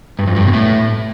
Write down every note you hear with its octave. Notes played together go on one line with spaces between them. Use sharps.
G2
F2
G2
B2
A2